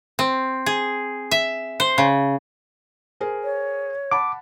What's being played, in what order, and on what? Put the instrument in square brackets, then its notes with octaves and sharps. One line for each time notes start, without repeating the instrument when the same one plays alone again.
[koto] C4
G#4
E5
C5
C#3
[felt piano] G#4 A#4 C5
[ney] C#5
[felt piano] F#5 A5 B5 [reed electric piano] D6